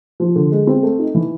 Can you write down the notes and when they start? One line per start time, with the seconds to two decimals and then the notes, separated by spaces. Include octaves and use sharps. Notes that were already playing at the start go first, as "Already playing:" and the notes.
0.20 F3
0.36 D3
0.52 G#3
0.67 C4
0.83 A3
0.99 D#4
1.15 E3